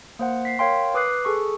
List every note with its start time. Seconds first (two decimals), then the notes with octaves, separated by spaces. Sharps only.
0.19 A#3 C5 F#5
0.45 B6 C7
0.59 A#4 C#5 F5 G5 C6
0.94 B4 D6 D#6 F#6 C7
1.25 G#4 A4 C#6